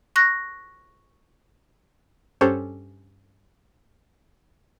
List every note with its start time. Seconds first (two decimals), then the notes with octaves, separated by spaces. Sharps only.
0.16 C#6 F#6 A#6
2.41 G2 C#4 G4 A4 C5 C#5